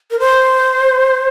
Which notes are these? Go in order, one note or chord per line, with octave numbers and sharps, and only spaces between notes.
A#4
C5